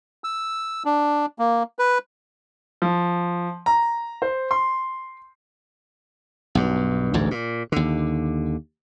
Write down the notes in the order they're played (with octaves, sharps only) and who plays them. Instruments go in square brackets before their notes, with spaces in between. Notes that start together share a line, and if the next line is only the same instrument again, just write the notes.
[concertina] E6
D4
A#3
B4
[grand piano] F3
A#5
C5
C6
[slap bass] B1 G2
A1 D2 G#2
A#2
D#2 D3